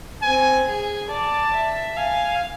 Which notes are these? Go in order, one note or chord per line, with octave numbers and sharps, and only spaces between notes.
C4 G#5
G#4
D5 A5
E5
F5 G#5